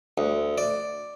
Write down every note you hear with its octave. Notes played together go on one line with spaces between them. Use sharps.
D2
D5